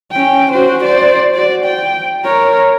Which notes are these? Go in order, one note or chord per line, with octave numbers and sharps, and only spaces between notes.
C#4 G5
F#4 C5
C5 D5
F#4 D5
G5
A#4 C#5